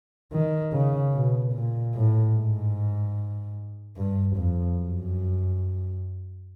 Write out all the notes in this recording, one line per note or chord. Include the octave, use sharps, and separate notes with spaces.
D#3
C#3
B2
A#2
A2
G#2
G2
F2
F#2